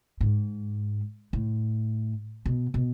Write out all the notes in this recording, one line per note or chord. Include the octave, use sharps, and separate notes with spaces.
G#2
A2
B2
B2